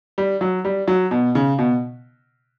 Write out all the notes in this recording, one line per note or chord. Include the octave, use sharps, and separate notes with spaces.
G3
F#3
G3
F#3
B2
C#3
B2